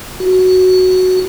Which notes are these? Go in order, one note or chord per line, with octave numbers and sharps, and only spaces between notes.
F#4